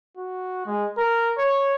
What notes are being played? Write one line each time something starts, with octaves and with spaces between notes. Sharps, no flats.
F#4
G#3
A#4
C#5